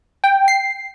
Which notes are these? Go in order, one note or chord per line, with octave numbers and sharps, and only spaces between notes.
G5
C7